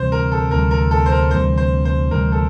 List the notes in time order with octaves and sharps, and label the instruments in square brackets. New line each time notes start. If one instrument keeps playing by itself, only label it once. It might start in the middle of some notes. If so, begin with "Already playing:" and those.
Already playing: [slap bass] D2 C3 E3 G3 [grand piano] C5
[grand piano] A#4
A4
[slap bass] D2 C3 E3 G3 [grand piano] A#4
[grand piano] A#4
A4
C5
A#4
[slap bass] D2 C3 E3 G3 [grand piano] C5
[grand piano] C5
C5
[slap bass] D2 C3 E3 G3 [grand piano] A#4
[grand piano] A4